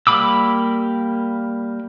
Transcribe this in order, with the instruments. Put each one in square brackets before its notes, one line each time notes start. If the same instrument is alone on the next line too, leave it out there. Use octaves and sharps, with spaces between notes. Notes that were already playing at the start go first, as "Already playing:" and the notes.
[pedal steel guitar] G3 A#3 B5 D6 E6